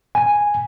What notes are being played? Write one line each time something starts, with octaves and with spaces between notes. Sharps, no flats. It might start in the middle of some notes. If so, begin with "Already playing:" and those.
G#5